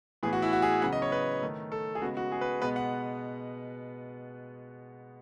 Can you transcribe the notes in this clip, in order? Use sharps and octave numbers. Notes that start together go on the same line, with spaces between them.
A2 E3 B3 G#4
F#4
E4
F#4
G#4
C#3 F#3 B3 F#5
D#5
C#5
B4
D#3 A3
A4
G#4
C#3 G#3 B3 F#4
F#4
G#4
B4
B2 G#3 B3 B4
F#5